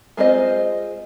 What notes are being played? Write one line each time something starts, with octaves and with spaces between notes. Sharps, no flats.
G#3 C4 F4 C5 D#5